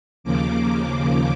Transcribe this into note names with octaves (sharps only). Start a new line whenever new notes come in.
D#2 C#3 F3 A#3 D6